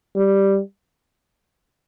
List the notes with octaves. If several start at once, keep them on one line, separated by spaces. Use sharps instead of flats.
G3